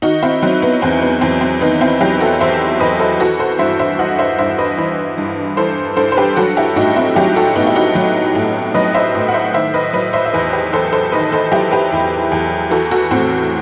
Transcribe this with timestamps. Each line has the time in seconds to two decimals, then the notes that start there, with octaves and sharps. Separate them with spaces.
0.02 D#3 D#4 F#4
0.23 C4 E4
0.42 F#3 C4
0.62 B3
0.82 E2 C4
1.02 B3
1.21 E2 C4
1.41 C4
1.61 D#3 B3 D#4
1.81 C4 E4
2.00 F#3 E4 G4
2.20 F#4 A4
2.40 E2 C5 E5
2.80 E2 B4 D#5
2.99 A4 C5
3.20 E3 F#4 A4
3.39 A4 C5
3.59 G2 C5 E5
3.79 C5 E5
3.99 E3 D#5 F#5
4.18 C5 E5
4.38 G2 C5 E5
4.58 B4 D#5
4.78 E3
5.18 G2
5.57 E3 A4 C5
5.97 G2 A4 C5
6.12 C5
6.17 G4 B4
6.36 F#3 F#4 A4
6.57 E4 G4
6.76 A2 D#4 F#4
6.96 C4 E4
7.16 F#3 E4 G4
7.36 F#4 A4
7.55 A2 B3 D#4
7.67 E4
7.76 D#4 F#4
7.95 F#3
8.35 A2
8.74 F#3 B4 D#5
8.94 C5 E5
9.15 A2
9.28 F#5
9.34 C5 E5
9.54 D#3 C5 E5
9.74 B4 D#5
9.93 F#3 B4 D#5
10.13 C5 E5
10.26 E5
10.33 E2 B4 D#5
10.53 G4 B4
10.72 E2 A4 C5
10.93 A4 C5
11.12 D#3 B4 D#5
11.32 A4 C5
11.52 F#3 E4 G4
11.72 G4 B4
11.92 E2
12.31 E2
12.71 E3 F#4 A4
12.91 F#4 A4
13.11 A2 C4